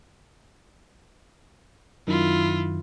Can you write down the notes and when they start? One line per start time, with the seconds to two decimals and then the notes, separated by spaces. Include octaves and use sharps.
2.07 F#2 D#3 E4 F4